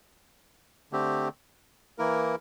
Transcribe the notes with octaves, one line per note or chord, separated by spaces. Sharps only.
D3 A3 C4 G4
E3 A#3 E4 A#4